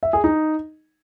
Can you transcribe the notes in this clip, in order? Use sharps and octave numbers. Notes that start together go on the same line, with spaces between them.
E5
G#4
D#4